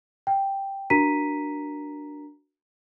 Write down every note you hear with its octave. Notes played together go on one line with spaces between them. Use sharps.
G5
D4 F#4 A#4 A#5 B6 D#7